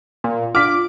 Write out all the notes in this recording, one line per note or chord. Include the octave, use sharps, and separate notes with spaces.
A#2
D4 F4 D6 F6 B6